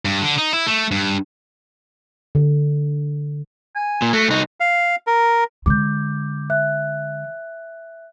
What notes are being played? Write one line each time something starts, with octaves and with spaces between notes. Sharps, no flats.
G2
D3
D#4
E4
A3
G2
D3
G#5
A#2
A3 F#4
C2 D#4 F#4
F5
A#4
D3 G#3 D6 G6
E5 F#6